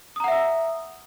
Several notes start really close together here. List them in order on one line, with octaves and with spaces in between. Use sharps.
D#6 A#5 F#5 E5 E6